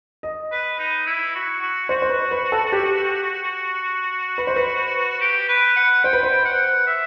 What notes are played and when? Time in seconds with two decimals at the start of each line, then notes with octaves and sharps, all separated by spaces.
0.23 D#5
0.52 B4
0.79 D#4
1.06 E4
1.35 F#4
1.62 F#4
1.89 F#4 C5
2.02 C5
2.10 B4
2.31 B4
2.52 A4
2.72 G4
4.38 B4
4.47 C5
4.56 B4
5.21 G4
5.49 B4
5.76 F#5
6.04 C5 G5
6.13 B4
6.23 C5
6.45 F#5
6.87 E5